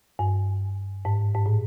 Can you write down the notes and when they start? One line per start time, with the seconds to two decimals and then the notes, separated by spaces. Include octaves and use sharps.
0.19 G2
1.05 G#2
1.35 G#2
1.46 A2